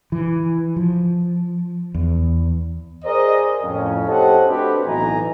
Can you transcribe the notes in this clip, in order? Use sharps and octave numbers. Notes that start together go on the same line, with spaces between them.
E3
F3
E2
G#4 A#4 C5 D5 D#5
F2 A2 C#4
G4 A4 C5 C#5 D#5 F#5
A3 C4 D4 F#4 G4 B4
B1 A2 E3 D#5 G#5 A#5